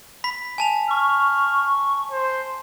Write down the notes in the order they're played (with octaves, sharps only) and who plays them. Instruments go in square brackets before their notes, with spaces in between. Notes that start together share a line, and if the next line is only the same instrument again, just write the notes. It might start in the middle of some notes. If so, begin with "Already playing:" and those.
[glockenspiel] B5 B6
G#5 A5 F7
[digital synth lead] C#6 [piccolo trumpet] F6
[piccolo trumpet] C5